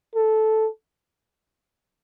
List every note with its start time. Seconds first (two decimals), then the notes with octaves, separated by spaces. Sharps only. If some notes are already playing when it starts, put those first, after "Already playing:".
0.15 A4